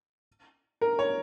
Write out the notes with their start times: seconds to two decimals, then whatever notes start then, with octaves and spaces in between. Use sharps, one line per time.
0.81 A#4
0.99 C#5